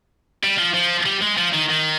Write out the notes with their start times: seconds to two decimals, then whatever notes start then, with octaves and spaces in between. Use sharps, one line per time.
0.44 G3
0.58 F3
0.74 F3
1.05 G3
1.21 G#3
1.37 F3
1.53 D#3
1.69 D#3